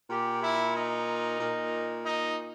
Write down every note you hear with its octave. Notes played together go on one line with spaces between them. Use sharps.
A#2 G4
E4
D#4
A#2
D#4